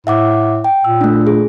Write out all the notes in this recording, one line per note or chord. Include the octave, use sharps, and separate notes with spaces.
A2 E5 F#5 D6
G5
A#2 E6
A3 D4
G#4